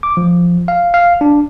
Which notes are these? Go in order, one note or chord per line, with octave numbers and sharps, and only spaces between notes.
D6
F3
F5
F5
D4